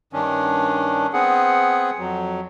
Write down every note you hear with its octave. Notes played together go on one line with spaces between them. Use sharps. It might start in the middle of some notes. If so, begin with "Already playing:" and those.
G2 D#3 C#4 D4
B3 C4 G#4 F#5
F2 F#3